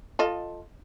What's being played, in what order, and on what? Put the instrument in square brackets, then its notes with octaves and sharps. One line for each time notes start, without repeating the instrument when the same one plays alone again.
[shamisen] F4 A4 D#5